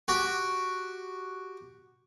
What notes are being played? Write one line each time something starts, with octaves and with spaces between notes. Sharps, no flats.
F#4 G4